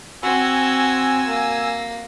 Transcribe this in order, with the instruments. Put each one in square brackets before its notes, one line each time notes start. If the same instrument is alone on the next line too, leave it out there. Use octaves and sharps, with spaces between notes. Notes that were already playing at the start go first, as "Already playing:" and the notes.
[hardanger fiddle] C4 F#4 [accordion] G#5 E6
[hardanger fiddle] A#3